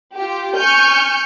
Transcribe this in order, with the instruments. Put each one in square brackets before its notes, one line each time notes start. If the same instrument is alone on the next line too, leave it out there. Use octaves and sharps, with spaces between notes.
[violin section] F4 G4
G#5 C#6 F6 G6